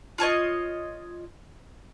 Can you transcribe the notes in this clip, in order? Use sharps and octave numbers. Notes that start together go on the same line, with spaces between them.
F4 A4 C#5 D#5